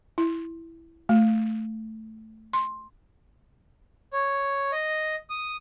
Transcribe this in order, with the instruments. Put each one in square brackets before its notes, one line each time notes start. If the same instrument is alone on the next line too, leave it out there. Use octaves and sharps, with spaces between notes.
[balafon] E4
A3
C6
[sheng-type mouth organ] C#5
D#5
D#6